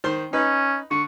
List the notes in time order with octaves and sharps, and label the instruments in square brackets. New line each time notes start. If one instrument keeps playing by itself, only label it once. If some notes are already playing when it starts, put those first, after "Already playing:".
[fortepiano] D#3 C5 C6
[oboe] C#4 [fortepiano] D#4 B4
[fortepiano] D3 [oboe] C#6